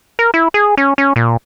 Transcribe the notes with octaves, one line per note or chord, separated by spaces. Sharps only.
A#4
E4
G#4
C#4
C#4
A#2